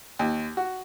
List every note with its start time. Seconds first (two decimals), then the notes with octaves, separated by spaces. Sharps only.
0.19 D#2
0.57 F#4